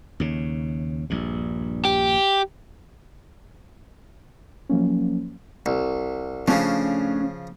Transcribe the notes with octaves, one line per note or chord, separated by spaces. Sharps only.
D#2 C#3
A#1 G2
G4
F3 F#3 A#3 C#4
C2
C#3 F3 A3 C#4 D4